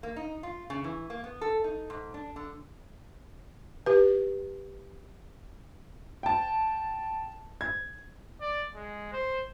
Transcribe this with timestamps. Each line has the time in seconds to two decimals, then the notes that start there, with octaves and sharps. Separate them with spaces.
0.03 A#3
0.16 D#4
0.43 F4
0.70 C#3
0.84 E3
1.10 A#3
1.24 B3
1.41 A4
1.64 D#4
1.90 G#2
2.14 D4
2.36 D3
3.86 G4 B4
6.23 G5 A5
7.61 G#6
8.41 D5
8.75 G#3
9.12 C5